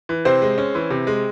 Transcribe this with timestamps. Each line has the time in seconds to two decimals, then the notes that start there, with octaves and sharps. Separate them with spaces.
0.09 E3
0.25 C3 C4 C5
0.42 G#3
0.58 C#4
0.75 E3
0.90 C3
1.07 G#3